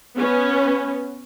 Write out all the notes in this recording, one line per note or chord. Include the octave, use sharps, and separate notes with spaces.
B3 C#4